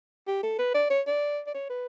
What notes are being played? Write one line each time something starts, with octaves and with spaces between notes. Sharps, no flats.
G4
A4
B4
D5
C#5
D5
D5
C#5
B4